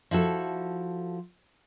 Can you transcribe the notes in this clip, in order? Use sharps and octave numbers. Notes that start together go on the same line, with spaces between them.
F3 E4 F#4 A4